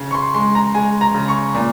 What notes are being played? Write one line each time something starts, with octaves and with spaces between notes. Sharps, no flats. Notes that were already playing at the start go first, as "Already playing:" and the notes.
Already playing: C#3
C#6
C6
G#3 C6
A#5
G#3 G#5
A#5
C#3
C#6
A#2